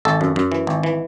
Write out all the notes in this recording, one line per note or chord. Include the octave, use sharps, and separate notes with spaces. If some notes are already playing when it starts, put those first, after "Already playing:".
G#1 A4
F#2
F#2
E3
G#1
E3